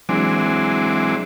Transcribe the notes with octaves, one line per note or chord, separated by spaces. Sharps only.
E3 F#3 G#3 C4 D4